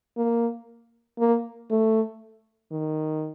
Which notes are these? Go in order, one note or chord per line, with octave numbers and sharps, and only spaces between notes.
A#3
A#3
A3
D#3